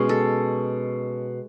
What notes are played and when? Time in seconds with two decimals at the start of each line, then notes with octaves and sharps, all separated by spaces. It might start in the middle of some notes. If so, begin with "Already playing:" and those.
Already playing: B2 G#3 C#4
0.09 A4